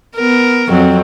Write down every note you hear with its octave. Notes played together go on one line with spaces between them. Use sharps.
B3 A#4
F2 F#3 C4